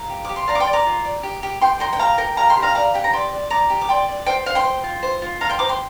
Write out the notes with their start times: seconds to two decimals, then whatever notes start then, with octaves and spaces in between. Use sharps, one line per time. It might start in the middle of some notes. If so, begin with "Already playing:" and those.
Already playing: F5 A#5
0.10 G4
0.25 G4 D6
0.36 C6
0.47 D5 F5 A#5
0.55 D6
0.60 G5 C6
0.67 D5
0.73 A#5 D6
0.86 F4
1.05 D5
1.23 G4
1.43 G4
1.61 G4 G5 C6
1.80 A#4 G5 C6
1.93 G5
1.99 G4 F5 A#5
2.18 A#4 G5
2.37 G4 F5 A#5
2.50 G5 C6
2.57 G4
2.62 F5 A#5
2.75 D5 F5 A#5
2.94 G4 G5
3.04 A#5
3.13 D5 G5 C6
3.32 D5
3.50 D5 A#5 D6
3.70 G4
3.81 D6
3.89 D5 G5 C6
4.08 D5
4.26 C5 G5
4.46 C5 F5
4.55 G5 C6
4.64 C5
4.84 F4
5.03 C5
5.22 F4
5.40 F4 F5 A#5
5.49 G5 C6
5.59 C5 A#5 D6
5.69 G5 C6